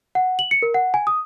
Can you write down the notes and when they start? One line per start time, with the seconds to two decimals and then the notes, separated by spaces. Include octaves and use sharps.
0.15 F#5
0.39 F#7
0.51 C#7
0.62 A#4
0.74 F#5
0.94 G#5
1.07 D#6